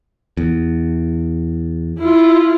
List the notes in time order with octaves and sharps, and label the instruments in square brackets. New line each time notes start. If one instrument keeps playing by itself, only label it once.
[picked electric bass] E2
[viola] E4 F4